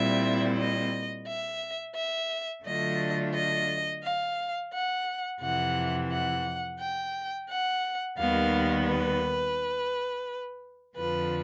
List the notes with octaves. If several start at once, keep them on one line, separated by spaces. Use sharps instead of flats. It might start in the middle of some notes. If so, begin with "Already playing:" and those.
Already playing: A#2 G3 C4 E4 E5
D#5
E5
E5
D3 F#3 A3 D4 F4 D#5
D#5
F5
F#5
F2 C3 E3 F#5
F#5
G5
F#5
D#2 D#3 G3 B3 F5
B4
F2 D3 F3 B4